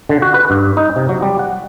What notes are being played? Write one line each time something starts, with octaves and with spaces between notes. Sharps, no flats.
D3
F#4
B4
G2
D#4
C3
F#3
G3
F#5